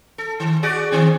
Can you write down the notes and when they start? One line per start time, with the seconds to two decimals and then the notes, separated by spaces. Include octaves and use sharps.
0.18 A4
0.40 D#3
0.63 F#4 G#4 D5
0.91 D#3 C4 G#4